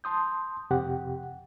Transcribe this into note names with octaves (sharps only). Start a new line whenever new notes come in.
A5 C6 D#6 G6
F2 C3 G4 F#5